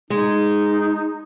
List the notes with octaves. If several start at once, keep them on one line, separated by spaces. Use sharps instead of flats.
G#3 D#4